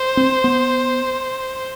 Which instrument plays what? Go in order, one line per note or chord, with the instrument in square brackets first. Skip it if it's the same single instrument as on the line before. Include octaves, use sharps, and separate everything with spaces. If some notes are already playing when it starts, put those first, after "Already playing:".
Already playing: [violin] C5
[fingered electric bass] C4
B3